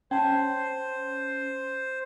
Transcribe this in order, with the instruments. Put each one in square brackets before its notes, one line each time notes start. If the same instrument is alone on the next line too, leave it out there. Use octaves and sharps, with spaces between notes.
[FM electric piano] C#4 [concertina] C5 [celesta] G5 A5